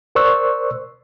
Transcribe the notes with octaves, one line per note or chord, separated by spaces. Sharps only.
A#4 C5 D5 C#6 E6 F#6